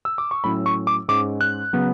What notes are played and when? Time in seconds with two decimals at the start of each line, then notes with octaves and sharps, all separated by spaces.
0.05 E6
0.18 D6
0.31 C#6
0.44 A2 F#3 C#4 E4 B5
0.66 C#6
0.87 D6
1.08 G#2 G#3 C#4 D6
1.41 F#6
1.73 C#3 F#3 B3